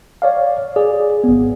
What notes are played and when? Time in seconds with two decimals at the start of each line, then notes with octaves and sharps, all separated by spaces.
0.22 C#5 D5 F5
0.76 G#4 D5
1.24 G#1 B3